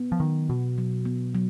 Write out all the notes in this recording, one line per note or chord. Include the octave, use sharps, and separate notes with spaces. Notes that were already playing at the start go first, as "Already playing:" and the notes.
Already playing: B3
F3
D#3 F#3
B2 F#4
F#3
B3
F#3